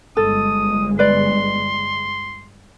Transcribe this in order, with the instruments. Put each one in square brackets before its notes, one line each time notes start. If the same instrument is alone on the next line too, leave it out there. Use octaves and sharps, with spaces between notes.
[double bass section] G1 G#3 [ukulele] A4 [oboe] D#6
[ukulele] B4 D5 [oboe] C6